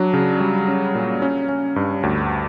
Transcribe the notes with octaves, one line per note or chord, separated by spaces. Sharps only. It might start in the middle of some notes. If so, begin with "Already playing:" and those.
Already playing: F#3 D4
C#3
G3
C#4
A#2
C#4
C#4
G2
D2